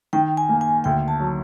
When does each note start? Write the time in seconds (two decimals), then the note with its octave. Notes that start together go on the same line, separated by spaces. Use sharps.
0.13 D#3 G5
0.37 G#5
0.49 A#3
0.61 G#5
0.84 D2 G5
1.08 A5
1.20 F#3